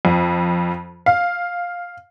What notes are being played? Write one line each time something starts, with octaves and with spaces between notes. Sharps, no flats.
F2
F5